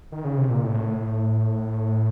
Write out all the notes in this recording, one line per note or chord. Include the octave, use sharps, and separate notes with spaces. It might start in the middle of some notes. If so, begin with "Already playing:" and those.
D#3
C#3
C3
A#2
A2